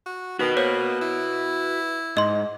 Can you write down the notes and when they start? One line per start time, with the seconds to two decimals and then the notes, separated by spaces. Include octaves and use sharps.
0.06 F#4
0.39 D#3 F#4 B4
0.57 A#3 C5 C#5
1.01 E4
2.17 G#2 D#5 C6